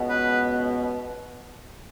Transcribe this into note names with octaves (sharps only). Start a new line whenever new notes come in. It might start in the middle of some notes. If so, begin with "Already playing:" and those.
Already playing: C#2 B2 B3
B4